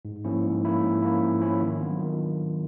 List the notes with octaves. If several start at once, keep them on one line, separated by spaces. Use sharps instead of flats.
G#2
F3 A#3 C#4 E4
G#2
F3 A#3 C#4 E4
G#2
F3 A#3 C#4 E4
G#2
F3 A#3 C#4 E4
D#3
F#3 B3 D4 F4
D#3